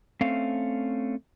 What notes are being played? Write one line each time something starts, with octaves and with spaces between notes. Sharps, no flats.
A3 C4 C#4 F5